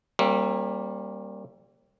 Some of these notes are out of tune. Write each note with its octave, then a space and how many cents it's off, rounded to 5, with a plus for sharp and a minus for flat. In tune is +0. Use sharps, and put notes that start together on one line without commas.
G3 +0 A#3 +0 C#4 -45